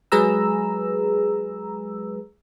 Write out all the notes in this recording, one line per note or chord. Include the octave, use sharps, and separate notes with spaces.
F#3 G#3 G#4 B4 A#5 E6